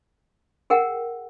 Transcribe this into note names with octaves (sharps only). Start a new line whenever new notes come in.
G#4 A#4 F#5 G5